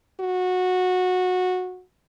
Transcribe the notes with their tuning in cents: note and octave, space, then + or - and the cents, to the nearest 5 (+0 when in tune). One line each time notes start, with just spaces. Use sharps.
F#4 -15